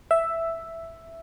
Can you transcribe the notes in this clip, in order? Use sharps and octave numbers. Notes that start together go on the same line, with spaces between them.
E5